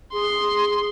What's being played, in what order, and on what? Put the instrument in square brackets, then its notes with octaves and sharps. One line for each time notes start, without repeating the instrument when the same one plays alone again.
[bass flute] G#4 [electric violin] C6